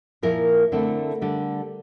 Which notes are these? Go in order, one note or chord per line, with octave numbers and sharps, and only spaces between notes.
A#2 F3 A#3 E4 A#4
D3 A3 C4 E4
D3 G3 D4